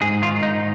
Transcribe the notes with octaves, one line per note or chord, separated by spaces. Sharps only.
G#2 G#4
D#3 F4
G#2 D#4